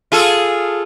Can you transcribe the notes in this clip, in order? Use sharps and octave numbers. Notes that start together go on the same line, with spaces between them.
F4 G#4 A4